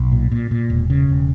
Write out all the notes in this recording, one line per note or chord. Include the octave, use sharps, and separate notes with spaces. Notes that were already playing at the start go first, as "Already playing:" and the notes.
Already playing: B1
A#2
A#2
A#2
E1
C#3
E1